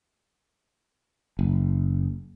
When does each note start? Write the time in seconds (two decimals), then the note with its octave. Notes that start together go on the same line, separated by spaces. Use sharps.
1.39 F#1